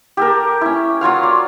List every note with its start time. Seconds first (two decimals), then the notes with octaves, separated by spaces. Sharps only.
0.17 G4 A4 A#4
0.61 C#4 E4
1.01 F#3 F4 C#5 F5
1.23 D5